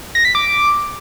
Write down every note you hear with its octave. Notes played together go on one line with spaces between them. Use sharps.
A#6
B6
D6